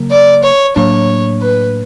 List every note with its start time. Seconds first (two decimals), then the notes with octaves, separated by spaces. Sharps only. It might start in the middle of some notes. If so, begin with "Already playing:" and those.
Already playing: C#3 F#3 A#3
0.11 D5
0.43 C#5
0.76 A2 F#3 A#3 D4 C#5
1.42 B4